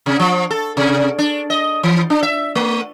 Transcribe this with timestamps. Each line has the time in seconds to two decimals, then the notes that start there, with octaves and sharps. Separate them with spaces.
0.06 C3
0.19 F3
0.51 A4
0.77 C3
1.19 D4
1.50 D#5
1.83 E3
2.10 D4
2.23 E5
2.55 A3